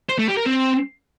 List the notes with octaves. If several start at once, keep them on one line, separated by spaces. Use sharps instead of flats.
C5
A3
G4
A#4
C4